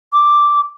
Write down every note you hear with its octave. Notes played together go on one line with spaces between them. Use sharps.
D6